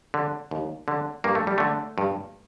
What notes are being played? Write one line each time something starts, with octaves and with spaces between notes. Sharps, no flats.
D3
D#2
D3
G2 A#3
A3
G3
D3 A3
G2